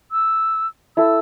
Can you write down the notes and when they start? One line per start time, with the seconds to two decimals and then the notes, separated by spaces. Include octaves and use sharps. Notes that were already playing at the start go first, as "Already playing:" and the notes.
0.12 E6
0.97 E4 A4 E6